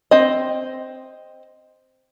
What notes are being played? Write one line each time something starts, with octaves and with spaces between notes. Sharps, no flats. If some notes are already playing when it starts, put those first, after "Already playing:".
C4 D#5